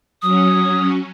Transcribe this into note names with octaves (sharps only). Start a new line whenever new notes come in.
F#3 C#4 D#6